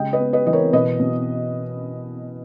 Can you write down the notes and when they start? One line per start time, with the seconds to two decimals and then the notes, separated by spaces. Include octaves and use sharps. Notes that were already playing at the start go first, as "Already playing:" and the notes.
Already playing: C#3 G#3 D#5 G5
0.13 B4 D#5
0.20 B3
0.33 B4 D#5
0.46 E3 D#5
0.53 A#4 C#5
0.73 B2 B4 D#5
1.00 B2